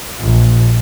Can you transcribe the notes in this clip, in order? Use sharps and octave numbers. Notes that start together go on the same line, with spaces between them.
A#1